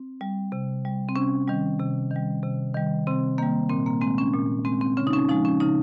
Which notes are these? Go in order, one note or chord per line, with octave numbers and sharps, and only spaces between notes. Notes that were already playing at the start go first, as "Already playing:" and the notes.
Already playing: C4
G3
C3
G3
C4
C3 C#4
D#3 G3
C3
D#3 G3
C3
D#3 G3
C3 C4
D#3 G3 A#3
A#2 C4
A#3
G#3 C4
C#4
A#2
G#3 C4
C4
C#3 C#4
D#4
C#4
F3 G#3 D#4
C#4
C#3 D#4